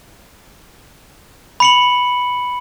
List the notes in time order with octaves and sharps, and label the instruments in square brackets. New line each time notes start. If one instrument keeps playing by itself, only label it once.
[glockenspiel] B5 C#7 F#7